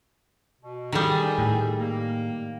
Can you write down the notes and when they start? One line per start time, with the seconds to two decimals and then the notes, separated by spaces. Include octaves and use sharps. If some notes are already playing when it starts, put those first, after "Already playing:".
0.61 B2
0.92 D#3 G3 G#4 A4
1.38 A2
1.78 A#3